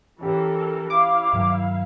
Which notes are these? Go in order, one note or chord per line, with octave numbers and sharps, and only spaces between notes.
E3 C#4 G4 A4 A#4
E4 F5 D6
G2 D#3 F#3